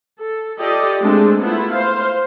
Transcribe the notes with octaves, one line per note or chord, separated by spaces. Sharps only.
A4
F4 G4 A4 D5 D#5
G#3 A3 C4 D4
A3 B3 E4 F4
C5 F5